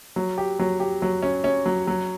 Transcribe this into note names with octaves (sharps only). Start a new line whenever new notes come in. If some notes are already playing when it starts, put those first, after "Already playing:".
F#3
G4
F#3
G4
F#3
C#4
C#4
F#3
F#3